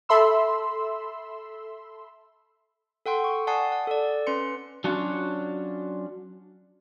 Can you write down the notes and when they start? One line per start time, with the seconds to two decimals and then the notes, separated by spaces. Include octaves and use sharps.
0.09 A4 E5 B5 C6 E6
3.06 A4 F#5 G5 C6
3.24 C#6
3.47 D5 F#5 G#5 A5 D#6 C7
3.72 F#5
3.87 A4 D5
4.27 C#4 B4 C6 C#7
4.84 F#3 C#4 D4 F4 F#4